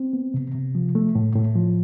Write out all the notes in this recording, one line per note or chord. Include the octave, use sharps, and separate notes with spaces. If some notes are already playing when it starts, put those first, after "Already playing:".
Already playing: C4
B3
C3
C3
F3
A3
A2
A2
F3